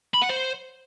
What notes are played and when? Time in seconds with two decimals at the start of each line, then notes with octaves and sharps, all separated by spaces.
0.14 B5
0.22 F#5
0.30 C5